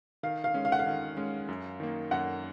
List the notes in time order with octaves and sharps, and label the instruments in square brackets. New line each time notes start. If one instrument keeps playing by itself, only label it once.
[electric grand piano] D#3 [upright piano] F5
[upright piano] F5
[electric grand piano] G#3 C#4
[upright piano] F5
F#5
F5
[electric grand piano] D#3
G#3 C#4
F#2
D#3 A#3
[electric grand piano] F#2 [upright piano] F#5